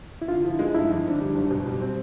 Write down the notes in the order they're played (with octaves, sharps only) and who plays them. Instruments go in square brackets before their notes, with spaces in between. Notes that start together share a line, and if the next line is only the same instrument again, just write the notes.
[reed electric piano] E4
[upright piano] D3 [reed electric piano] F4
[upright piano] F3 [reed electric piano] E4
[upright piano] G#3 [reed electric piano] D#4
[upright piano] G2 [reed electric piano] E4
[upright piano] F2 [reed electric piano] D#4
[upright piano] D3
[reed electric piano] D4
[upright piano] G3
F#1
B2
G3
C4